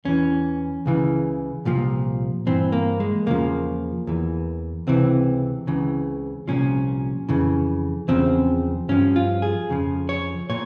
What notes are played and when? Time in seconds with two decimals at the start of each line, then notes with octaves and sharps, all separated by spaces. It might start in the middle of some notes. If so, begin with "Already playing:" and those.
0.05 E2 E3 C#4
0.86 C#2 C#3 E3
1.65 C2 A#2 F3
2.46 G2 E3 C4
2.72 A#3
3.00 G#3
3.26 E2 C#3 F3 A#3
4.07 E2 E3
4.87 C#2 C3 E3 C4
5.67 C#2 C#3 E3
6.48 C2 A#2 F3 C#4
7.29 F2 C#3 E3
8.08 E2 C#3 F3 C4
8.89 G2 F3 C#4
9.16 F4
9.42 G#4
9.69 F2 C#3 F3
10.09 C#5
10.50 A#2 C#5